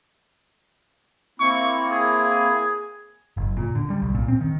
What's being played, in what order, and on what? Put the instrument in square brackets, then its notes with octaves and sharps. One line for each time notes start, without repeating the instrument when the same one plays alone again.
[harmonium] A#3 C4 E4 [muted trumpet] C#6
[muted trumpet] G#4
[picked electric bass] F#1
A#2
D3
G3
B1
A#2
C4
D#3